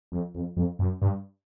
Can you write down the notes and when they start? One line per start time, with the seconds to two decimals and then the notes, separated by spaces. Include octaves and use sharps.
0.12 F2
0.35 F2
0.57 F2
0.79 F#2
1.02 G2